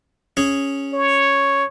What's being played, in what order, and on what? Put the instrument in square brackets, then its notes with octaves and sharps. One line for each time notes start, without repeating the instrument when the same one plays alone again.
[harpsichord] C#4 G#4
[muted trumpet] C#5